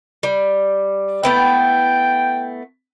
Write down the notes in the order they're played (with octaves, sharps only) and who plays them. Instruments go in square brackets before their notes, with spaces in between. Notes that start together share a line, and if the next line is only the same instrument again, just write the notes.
[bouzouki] G3
[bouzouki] A3 B3 E4 [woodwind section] G5